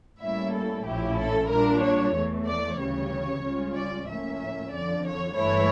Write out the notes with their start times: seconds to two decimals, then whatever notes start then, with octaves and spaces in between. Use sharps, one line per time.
0.21 A2 G3 A#3 C#4 E4 E5
0.54 A4
0.85 A#1 A2 F3 C#4 E4 G4
1.18 A4
1.49 A#2 G3 D4 A#4
1.82 C#5
2.14 E2 E3 A3
2.46 D5
2.78 D2 C#3 E3 G3 C#5
3.43 C#2 C#3 G3 C#4 F4
3.75 D5
4.07 A2 F3 A#3 C#4 E5
4.72 F2 D3 F3 D5
5.05 C#5
5.36 G1 G2 E3 A3 E4 C#5